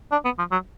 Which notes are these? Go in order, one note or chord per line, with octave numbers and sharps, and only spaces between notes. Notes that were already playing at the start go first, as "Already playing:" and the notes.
D4
B3
F3
F#3